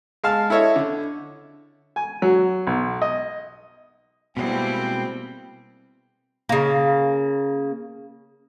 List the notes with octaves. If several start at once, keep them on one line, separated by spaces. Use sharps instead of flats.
G#3 F5 A5 F6
E4 A4 C#5 D#5 E5
D3
G#5
F#3
B1
D#5
B2 G3 G#3 A#3 C4 E4 B4 G5
C#3 A#3